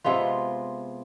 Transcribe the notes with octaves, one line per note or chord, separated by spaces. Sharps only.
C3 G#3 B3 F4